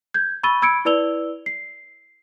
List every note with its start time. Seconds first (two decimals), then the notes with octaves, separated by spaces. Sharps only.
0.14 G6 G#6
0.43 B5 C#6 E6 A6 D#7 G7
0.62 B5 E6 G#6 C#7 D7
0.85 E4 B4 D5 E6 F7 G7
1.46 C7